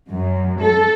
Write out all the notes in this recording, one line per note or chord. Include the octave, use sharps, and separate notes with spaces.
F#2
A4